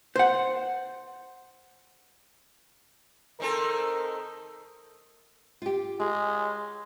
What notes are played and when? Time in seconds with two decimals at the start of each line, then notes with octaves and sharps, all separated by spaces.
0.16 C5 F#5
3.40 D#3 C4 A4 A#4
5.62 F4 G4
6.00 G#3 G#4